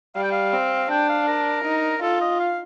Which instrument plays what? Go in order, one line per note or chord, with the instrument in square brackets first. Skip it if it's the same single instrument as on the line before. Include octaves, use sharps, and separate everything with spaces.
[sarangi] G3 [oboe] F5
[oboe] G5
F5
[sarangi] C4
[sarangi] D4 [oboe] G5
[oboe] F5
A#4
[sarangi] D#4
[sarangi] F4 [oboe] A4
[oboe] D#5
F5